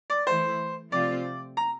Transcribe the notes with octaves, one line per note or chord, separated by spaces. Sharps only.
D5
E3 A3 E4 C5
C3 F3 A3 C4 F4 D5
A#5